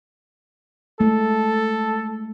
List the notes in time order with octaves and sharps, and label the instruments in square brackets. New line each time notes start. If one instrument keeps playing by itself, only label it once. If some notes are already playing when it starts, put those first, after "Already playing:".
[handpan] G#3 A3 [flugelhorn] A4